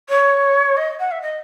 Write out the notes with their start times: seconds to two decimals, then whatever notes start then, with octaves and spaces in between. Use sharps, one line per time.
0.09 C#5
0.76 D#5
0.99 F#5
1.11 E5
1.21 D#5